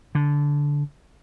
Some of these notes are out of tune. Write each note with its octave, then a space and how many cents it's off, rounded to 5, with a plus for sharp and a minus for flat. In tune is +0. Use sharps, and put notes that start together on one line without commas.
D3 -15